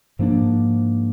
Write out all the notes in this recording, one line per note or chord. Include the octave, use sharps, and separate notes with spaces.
G#2 F3 A#3 D4